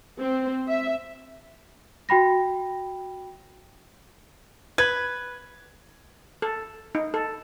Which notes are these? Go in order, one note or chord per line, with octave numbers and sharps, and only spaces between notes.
C4
E5
F#4 G5 B5 A#6
B4 G#6
A4
D#4
A4